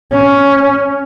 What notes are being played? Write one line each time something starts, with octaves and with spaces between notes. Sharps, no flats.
C#4